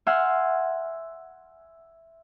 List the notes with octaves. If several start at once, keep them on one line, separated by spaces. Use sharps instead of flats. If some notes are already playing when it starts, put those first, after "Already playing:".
E5 F#5 G#5 C6 F6